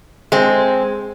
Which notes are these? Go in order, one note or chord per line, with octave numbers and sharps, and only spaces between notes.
G#3 C4